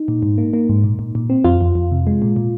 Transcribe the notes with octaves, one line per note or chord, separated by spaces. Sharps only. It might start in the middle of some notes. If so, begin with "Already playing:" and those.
Already playing: D#4
A#2
G#2
A#3
A#3
G#2
A#2
A#2
A#2
C4
F2 F4
F2
F2
C3
G#3
A#2
A#2